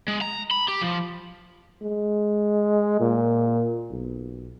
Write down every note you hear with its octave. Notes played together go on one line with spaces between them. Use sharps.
G#3
A#5
B5
G4
F3
G#3
A#2
B1